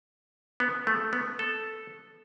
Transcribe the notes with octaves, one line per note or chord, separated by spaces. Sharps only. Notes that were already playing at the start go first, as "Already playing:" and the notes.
B3
A3
B3
A4